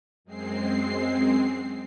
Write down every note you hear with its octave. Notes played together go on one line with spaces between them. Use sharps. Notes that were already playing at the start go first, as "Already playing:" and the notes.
F#2 G#3 C4 C7